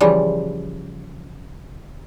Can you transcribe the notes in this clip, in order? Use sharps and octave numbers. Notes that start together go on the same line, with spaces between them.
C#3 E3 F3 G3